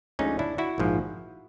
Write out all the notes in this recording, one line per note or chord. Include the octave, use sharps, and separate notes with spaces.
D2 D3 F3 G#3 C#4 D#4
D4 E4
E4 F#4
A#1 G#2 F3